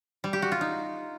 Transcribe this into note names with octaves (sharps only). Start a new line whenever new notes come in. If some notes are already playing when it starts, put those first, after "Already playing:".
G3
G4
F#4
F4
D#4